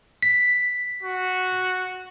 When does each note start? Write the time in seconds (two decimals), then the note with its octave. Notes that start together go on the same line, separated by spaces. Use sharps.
0.22 B6
1.03 F#4